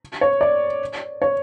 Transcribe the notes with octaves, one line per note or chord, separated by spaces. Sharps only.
C#5
D5
C#5